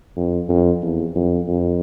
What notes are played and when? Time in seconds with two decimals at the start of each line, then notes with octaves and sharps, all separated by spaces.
0.16 F2
0.49 F2
0.82 E2
1.15 F2
1.48 F2